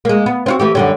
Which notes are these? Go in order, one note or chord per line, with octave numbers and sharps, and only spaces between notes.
G#3 A#3
B3
C4 F4 F#4
E3 A3 G4
F#2 D3 G3